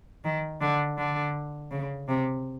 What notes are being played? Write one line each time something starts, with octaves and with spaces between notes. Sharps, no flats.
D#3
D3
D3
C#3
C3